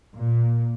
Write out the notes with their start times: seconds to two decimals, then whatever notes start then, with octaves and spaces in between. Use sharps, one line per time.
0.15 A#2